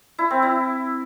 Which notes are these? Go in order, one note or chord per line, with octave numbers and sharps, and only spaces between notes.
E4
C4
E4